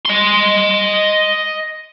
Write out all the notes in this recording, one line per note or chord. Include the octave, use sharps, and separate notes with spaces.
D#5 C6